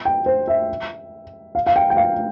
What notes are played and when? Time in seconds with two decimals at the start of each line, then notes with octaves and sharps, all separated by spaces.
0.05 G5
0.26 C5
0.48 E5
1.55 F5
1.67 F5
1.76 G5
1.90 G5
1.97 F5